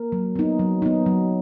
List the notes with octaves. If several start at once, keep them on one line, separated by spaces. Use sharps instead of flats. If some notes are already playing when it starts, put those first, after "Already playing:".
Already playing: A#3 A#4
F#3
B3 D#4
F#3
B3 D#4
F#3